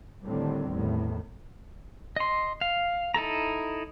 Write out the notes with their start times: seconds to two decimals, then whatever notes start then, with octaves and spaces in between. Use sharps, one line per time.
0.25 A2 D3 D#3 G3 C4
0.70 E2 A2 D#3
2.16 D#5 C6
2.61 F5
3.14 D#4 E4 A4 A#5